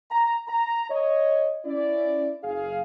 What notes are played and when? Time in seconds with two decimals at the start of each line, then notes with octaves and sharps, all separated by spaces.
0.11 A#5
0.48 A#5
0.90 C#5 D#5
1.65 C#4 E4 D5
2.43 F#1 G#4 F5